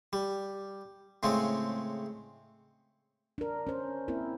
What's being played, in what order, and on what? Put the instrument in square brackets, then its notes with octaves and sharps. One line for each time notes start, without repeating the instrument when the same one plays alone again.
[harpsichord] G3
A2 C#3 G#3 C4
[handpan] D4 A#4
C#4 C5
A#3 C4 E4 A#4